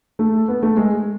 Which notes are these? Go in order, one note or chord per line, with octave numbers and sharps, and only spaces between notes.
A3
B3
A3
G#3